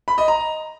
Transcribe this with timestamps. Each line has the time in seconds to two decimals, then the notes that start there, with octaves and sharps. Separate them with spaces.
0.08 B5
0.18 D#5
0.28 A#5